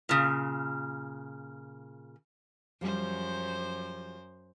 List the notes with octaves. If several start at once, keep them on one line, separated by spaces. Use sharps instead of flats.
A#2 C#3
F#2 F3 G3 C5